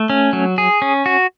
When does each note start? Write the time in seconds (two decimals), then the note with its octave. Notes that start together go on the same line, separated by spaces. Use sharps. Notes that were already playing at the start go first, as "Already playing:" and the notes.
Already playing: A3
0.10 C#4
0.33 F#3
0.58 G#4
0.82 C#4
1.06 F#4